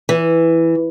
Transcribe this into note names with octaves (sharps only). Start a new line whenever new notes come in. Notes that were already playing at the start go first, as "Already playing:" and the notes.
E3